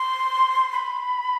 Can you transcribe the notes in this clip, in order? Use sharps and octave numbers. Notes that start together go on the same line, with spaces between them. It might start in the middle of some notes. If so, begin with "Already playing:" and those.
Already playing: C6
B5